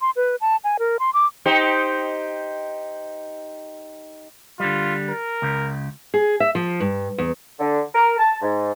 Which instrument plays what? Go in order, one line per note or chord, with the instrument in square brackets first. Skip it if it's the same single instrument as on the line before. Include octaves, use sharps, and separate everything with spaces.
[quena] C6
B4
A5
G#5
A#4
C6
D6
[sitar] D#4 G4 C5
[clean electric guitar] D3 G3 [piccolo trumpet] F4
[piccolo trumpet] A#4
[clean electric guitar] C#2 C#3
[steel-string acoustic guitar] G#4
E5
F3
G2
E2
[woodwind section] D3
A#4
A5
G#2